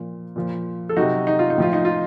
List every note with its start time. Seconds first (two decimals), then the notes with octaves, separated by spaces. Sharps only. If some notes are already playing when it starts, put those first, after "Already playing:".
Already playing: A#2 F3
0.36 A#2 F3
0.89 A4
0.96 C3 F#3 D#4 F#4
1.27 D#4
1.39 F4
1.50 D#4
1.58 A2 F3 F4
1.73 D#4
1.85 F4